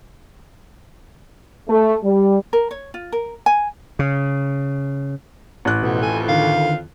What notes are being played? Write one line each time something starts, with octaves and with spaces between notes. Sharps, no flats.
A3
G3
A#4
C#5
F4
A#4
G#5
C#3
A1 F#6
F2 B2 E3 B3
A4 G#5
D3 D#3 F5